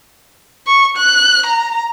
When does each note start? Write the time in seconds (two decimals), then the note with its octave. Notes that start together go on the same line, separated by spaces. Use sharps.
0.67 C#6
0.97 F#6
1.46 A#5